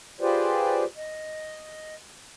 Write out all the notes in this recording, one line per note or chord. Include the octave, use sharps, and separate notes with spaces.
F4 G4 G#4 B4 C5 D5
D#5